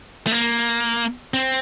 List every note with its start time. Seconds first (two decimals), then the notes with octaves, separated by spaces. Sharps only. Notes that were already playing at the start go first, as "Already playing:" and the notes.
0.27 A3
0.32 A#3
1.34 C4